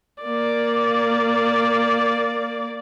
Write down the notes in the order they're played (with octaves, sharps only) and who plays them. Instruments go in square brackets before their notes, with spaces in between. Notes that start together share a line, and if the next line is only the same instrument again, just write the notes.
[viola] A#3 D5